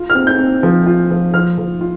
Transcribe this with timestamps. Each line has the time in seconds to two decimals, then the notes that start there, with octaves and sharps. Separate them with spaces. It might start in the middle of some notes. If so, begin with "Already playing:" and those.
Already playing: F4
0.10 F6
0.15 C4
0.27 G6
0.39 C4
0.63 F3
0.86 F4
1.11 F3
1.34 F3 F6
1.58 F3
1.81 F4